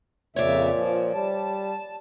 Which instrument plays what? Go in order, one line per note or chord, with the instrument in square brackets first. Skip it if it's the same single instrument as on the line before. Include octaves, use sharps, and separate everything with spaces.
[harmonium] F2 C#3 E5 [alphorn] A#2 [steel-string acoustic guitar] C#5 D5
[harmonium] F3
[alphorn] G3 [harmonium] A5